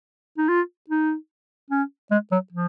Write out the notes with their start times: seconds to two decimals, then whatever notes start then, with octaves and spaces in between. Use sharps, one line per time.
0.38 D#4
0.49 F4
0.90 D#4
1.70 C#4
2.11 G#3
2.32 F#3
2.52 F3